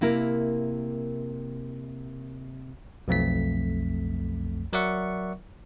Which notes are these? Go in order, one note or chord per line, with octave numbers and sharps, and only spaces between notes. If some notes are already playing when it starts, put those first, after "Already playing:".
C3 A#3 E4 A#4
B1 F2 A3 B6
F#3 A#4 D5 E5 F#5 C#6